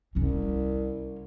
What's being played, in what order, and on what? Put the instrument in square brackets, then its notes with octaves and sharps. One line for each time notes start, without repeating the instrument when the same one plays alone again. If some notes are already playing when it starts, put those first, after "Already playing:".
[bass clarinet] C2 [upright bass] C3 C#4